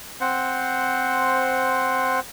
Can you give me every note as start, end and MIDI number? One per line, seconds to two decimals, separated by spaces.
0.21 2.20 60
0.21 2.20 72
0.21 2.20 78